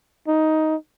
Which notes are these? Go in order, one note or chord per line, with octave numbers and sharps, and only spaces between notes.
D#4